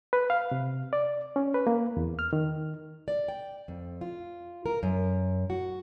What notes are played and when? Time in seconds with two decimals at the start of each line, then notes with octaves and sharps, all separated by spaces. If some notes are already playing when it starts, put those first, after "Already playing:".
0.13 B4
0.30 F5
0.51 C3
0.93 D5
1.36 C#4
1.54 B4
1.67 A#3
1.97 E2
2.19 F6
2.33 D#3
3.08 D5
3.28 G5
3.68 F2
4.01 F4
4.66 A#4
4.83 F#2
5.50 F#4